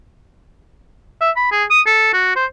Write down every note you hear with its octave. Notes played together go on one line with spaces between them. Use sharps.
E5
B5
G#4
D#6
A4
F#4
C5